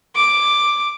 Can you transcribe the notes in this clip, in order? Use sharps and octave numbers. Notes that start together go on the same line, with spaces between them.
D6